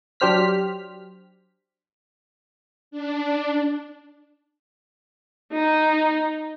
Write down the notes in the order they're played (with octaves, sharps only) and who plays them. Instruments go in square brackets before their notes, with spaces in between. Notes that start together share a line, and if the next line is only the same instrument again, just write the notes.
[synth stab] F#3 D4 G4 C5 F6 B6
[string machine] D4
[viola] D#4